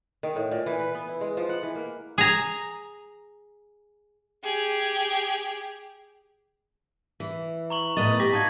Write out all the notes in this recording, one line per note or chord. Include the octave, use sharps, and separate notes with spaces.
D#3
A2
A#2
E3
B4
B3
E4
G#3
F3
F#5
E3
A#3
G#4 A#5
G4 G#4
E3
A#5 C#6 F#7
A2 B3 D#5 A6
G4 D6 A#6 B6
D#4 F4 F#4 A5 G#6